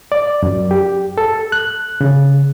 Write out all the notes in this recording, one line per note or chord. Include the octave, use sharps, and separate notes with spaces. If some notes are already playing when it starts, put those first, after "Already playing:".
D5
F#2
G4
A4
F#6
C#3